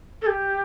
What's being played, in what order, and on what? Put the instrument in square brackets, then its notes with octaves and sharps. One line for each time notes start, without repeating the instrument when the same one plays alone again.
[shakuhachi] A4
G4